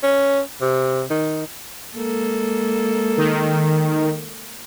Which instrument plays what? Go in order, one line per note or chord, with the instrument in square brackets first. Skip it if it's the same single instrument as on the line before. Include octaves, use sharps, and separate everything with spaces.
[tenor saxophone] C#4
C3
D#3
[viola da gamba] G#3 A#3 A4
[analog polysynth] D#3